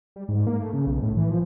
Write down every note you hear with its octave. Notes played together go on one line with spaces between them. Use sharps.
G3
G#2
A#3
A3
C#3
B1
A2
E3
F3